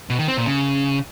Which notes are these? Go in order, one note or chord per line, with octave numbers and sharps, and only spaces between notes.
B2
D#3
C4
A#2
C#3